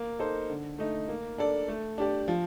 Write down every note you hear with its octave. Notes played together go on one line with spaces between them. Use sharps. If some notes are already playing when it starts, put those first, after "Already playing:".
Already playing: A#3
D#4 A4 C5
D3
A3 D#4
A#3
D4 A4 D5
A3
D4 G4 D5
F3